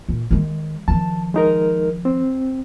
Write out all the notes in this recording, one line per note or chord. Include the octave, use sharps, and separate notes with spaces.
A#2
D#3 G#3
D#3 F3 A5
G#3 D#4 A#4
C4